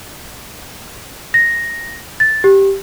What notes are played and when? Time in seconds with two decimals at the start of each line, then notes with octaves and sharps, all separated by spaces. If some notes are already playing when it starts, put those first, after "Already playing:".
1.34 A#6
2.20 A6
2.44 G4